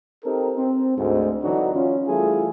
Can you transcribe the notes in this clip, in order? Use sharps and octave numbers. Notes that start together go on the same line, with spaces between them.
C4 D#4 G4 A4 A#4
C4
D2 G#2
D3 E3 F#3 D4 D#4 F#4
C#4 F4
E3 G3 A3 E4 F4 G#4